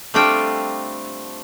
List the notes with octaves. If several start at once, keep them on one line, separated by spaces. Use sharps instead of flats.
G3 A3 C4 D4 F4 G5